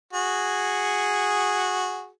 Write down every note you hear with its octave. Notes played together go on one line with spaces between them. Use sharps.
F#4 G#4